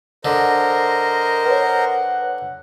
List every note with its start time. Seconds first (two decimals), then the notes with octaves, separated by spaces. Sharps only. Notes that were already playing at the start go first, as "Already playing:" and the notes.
0.25 D3 A#4 C5 D#5
1.46 B4 C#5 F#5